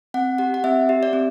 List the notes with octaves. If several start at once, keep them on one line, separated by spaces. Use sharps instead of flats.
C4 F#5
G4 F#5
F#5
C4 E5
G4 E5
D5
C4